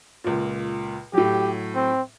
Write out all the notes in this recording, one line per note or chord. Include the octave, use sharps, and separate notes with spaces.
C#2 A#2
A2 F#3 G4
C4